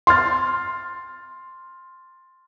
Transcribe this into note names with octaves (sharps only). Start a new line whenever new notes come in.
C6 F6 A6